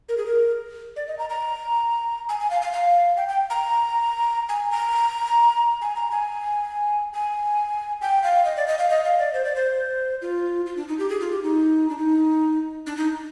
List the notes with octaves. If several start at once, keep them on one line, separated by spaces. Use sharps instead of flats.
A#4
G#4
A#4
D5
D#5
A#5
A#5
G#5
G#5
F5
F5
F5
G5
G5
A#5
G#5
A#5
G#5
A#5
G#5
G#5
G5
F5
D#5
D5
D#5
F5
D#5
F5
D5
C5
D5
C5
F4
F4
D4
D#4
G4
G#4
F4
G4
D#4
D4
D#4
D4
D#4